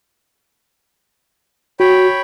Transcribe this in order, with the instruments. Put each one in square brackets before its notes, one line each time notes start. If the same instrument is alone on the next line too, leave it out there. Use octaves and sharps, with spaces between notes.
[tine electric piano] F#4 [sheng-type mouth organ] C#5 G5 B5